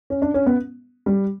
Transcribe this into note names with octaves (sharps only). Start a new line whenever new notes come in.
C#4
D4
C#4
B3
G3